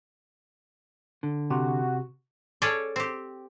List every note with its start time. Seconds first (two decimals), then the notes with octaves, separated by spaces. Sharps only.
1.23 D3
1.50 C3 F#4
2.62 C#4 G#4 A4 C#5 D5
2.96 C4 G4